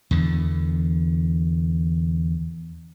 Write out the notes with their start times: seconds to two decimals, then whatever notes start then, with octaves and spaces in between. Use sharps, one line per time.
0.11 E2 D3